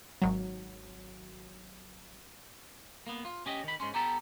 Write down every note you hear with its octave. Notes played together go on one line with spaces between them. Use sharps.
G#1 F#3
A#3 B3
F4
C#4 G4 D#5
D#3 B5
G#2 C#4 C6
B3 G4 A4 A#5